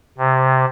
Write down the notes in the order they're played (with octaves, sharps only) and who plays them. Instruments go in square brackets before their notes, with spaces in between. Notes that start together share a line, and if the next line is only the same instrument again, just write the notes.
[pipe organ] C3